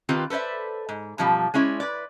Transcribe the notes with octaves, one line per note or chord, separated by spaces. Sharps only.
D#3 C4 F4 G4 B4
A4 B4 C5 D5 E5
G#2
F#2 B2 F3 G3
G#3 C#4 E4 D5
B4 D5